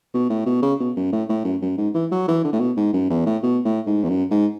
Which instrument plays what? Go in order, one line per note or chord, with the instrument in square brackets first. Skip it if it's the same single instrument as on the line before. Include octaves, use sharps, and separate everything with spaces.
[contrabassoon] B2
A2
B2
C#3
B2
F#2
A2
A2
F#2
F#2
G#2
E3
F#3
E3
D3
A2
B2
G#2
F#2
E2
A2
B2
A2
G#2
E2
F#2
G#2